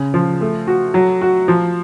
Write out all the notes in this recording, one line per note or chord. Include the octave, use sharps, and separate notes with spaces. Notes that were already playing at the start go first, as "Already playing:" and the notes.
Already playing: C#3
F3
A3
F#4
F#3
F#4
F3